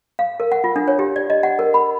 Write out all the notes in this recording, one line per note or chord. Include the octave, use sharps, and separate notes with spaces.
F5
A#4
F#5
F4
D4
C#5
G4
D5
D#5
F#5
A#4
B5